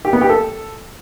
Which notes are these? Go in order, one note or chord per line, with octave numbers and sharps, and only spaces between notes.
G4
B3
G4
A4